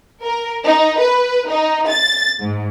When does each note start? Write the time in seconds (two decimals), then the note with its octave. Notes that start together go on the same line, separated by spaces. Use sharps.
0.23 A#4
0.65 D#4
0.99 B4
1.48 D#4
1.89 A6
2.40 G#2